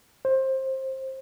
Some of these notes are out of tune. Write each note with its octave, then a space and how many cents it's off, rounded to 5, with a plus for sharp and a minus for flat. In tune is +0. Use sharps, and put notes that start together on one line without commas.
C5 +20